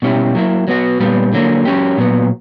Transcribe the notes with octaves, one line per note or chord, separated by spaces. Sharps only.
B2 G3 C#4 E4 G4
F#3 A#3 E4
F#3 B3 F#4
A#2 G3 B3
D3 F#3 A#3
F#3 C#4 G4
A#2 F#3 B3